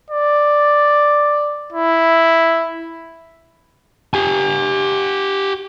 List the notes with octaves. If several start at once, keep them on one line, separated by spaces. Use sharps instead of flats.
D5
E4
G4 G#5